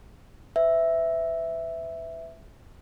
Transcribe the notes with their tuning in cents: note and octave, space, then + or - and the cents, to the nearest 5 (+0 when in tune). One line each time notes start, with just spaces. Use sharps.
B4 +40 E5 +0